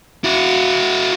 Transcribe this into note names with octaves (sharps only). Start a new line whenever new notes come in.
E4 F#4